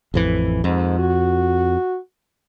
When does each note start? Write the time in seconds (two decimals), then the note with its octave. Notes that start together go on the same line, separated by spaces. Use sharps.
0.14 A1 F2 E3
0.64 F2 G#2
0.99 F#4